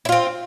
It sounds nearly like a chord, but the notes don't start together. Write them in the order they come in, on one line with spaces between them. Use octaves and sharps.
E4 F4 C4